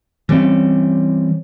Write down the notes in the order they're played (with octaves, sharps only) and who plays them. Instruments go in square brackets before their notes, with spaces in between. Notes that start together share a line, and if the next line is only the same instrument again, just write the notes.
[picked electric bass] E3 G3 C4 C#4